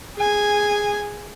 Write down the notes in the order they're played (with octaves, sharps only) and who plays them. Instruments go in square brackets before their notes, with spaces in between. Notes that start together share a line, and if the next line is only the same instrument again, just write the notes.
[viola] G#4 G#5